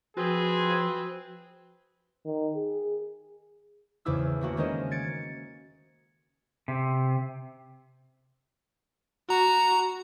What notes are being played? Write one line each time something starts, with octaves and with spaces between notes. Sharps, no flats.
F3 C4 F#4 G#4 B4
D#3
G#4
G#1 E2 C#3 E4 D6 E6
A3 A#3 F#4
D#3 G#3 C#4 A#4 C5 D#5
G#6 A6 C#7 D7
C3
F#4 A#5